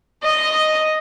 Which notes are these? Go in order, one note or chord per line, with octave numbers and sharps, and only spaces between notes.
D#5